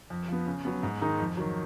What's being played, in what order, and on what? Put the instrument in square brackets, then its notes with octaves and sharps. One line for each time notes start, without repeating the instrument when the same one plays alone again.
[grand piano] F2
F3 B3
C#3
F#3 B3
G#2
D#3 G#3 D#4
F2
D#3 F#3